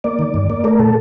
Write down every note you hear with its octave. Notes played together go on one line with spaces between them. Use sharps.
A#3 D5
D#3
G2
A#3
A3 A#4
A#2 A4